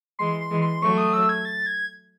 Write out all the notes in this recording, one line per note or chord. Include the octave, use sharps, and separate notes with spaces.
E3 G#3 C6
C6
E3 G#3
C6
F#3 A3 C#6
D#6
E6
G#6
A6
G#6